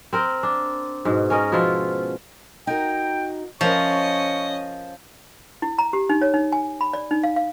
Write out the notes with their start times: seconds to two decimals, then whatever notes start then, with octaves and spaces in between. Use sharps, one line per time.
0.13 C4 A#4 G5
0.43 D4
1.05 G#2 B2
1.30 C#4 A#4 D#5
1.52 B2 F3 E4 F4
2.67 D#4 F#4 A#4 G5
3.61 F3 C#4 A#4 C#5 D#5 E5 C#6
5.62 E4
5.78 A#5
5.93 G4
6.09 D#4
6.21 C#5
6.34 D#4
6.52 G#5
6.81 B5
6.93 D5
7.11 D#4
7.23 F5
7.36 F5